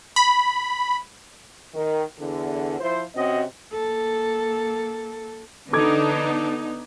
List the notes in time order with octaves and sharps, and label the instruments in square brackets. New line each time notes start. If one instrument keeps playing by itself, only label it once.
[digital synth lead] B5
[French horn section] D#3
E2 D3
F3 E4 F4 C5
C3 C4 C#4 F#4 D#5
[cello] A#3 A4
[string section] D3 D4 [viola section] B3 D#4 [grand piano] A4 D6 G#6